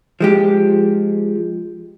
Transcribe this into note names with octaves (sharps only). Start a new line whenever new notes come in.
F3 G#3 G4